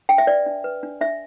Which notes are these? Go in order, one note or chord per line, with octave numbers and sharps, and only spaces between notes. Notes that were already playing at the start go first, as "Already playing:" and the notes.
D4 G5
E5
B4 D5
D4
B4
D4
D4 E5